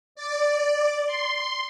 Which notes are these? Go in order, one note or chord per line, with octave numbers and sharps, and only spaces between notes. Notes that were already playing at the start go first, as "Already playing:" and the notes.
D5
C6